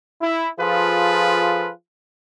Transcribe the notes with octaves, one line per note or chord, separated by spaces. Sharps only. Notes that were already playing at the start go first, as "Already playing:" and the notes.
E4
F3 F4 G#4 A4 B4